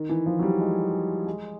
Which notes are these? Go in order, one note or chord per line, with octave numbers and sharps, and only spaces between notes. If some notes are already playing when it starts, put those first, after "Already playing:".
Already playing: D#3
E3
F3
F#3
G3
G#3
G#3